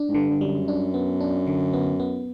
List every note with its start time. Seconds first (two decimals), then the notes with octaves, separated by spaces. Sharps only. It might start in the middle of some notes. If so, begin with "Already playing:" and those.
Already playing: D4
0.09 G#2
0.14 G2 D3
0.30 G2
0.41 F#2 G3
0.68 D4
0.94 B3
1.20 D4
1.47 D3
1.73 B3
2.00 B3